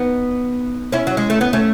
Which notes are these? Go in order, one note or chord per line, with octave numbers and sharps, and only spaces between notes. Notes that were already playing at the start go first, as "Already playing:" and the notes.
Already playing: B3 D#4
C#4 E4
F#3
G#3
A3
B3
A3 C#4